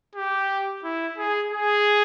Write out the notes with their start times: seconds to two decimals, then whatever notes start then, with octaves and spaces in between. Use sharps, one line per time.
0.16 G4
0.84 E4
1.18 G#4
1.52 G#4